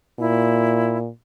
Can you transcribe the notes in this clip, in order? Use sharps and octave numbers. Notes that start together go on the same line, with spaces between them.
A#2 E4